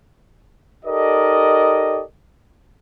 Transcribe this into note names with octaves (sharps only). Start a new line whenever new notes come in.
D#4 G4 A4 A#4 D5 D#5